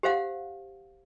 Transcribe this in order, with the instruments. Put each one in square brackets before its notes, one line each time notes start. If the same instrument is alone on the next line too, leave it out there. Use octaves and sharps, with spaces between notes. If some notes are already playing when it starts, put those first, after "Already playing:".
[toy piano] G4 C5 F5 F#5